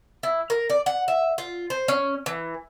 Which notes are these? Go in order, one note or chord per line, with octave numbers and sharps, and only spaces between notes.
E4
A#4
D5
F#5
E5
F4
C5
C#4
E3